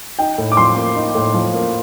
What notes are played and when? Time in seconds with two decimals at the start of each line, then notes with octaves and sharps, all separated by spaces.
0.19 D#4 G5
0.38 A2
0.52 D6
0.57 F3 C6
0.76 A#3
0.96 D#4
1.15 A2
1.34 F3
1.53 A#3